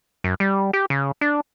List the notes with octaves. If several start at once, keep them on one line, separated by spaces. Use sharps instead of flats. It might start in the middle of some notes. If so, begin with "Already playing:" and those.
F#2
G3
G4
C#3
D4